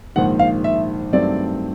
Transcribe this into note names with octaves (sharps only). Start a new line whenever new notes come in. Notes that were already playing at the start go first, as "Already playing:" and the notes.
A#1 G#2 D#3 F#5
F5
E5
G2 D#3 F#3 A3 C4 D5